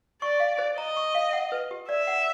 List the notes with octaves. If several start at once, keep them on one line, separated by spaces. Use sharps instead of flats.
D5 C#6
F5
C5
D#5 A#5
C#6
F5
F#5
B4
G4
D5 E5
F#5